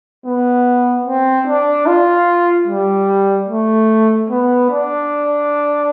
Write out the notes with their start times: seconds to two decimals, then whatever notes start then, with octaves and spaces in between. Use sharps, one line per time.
0.25 B3
1.06 C4
1.47 D4
1.87 F4
2.67 G3
3.49 A3
4.30 B3
4.70 D4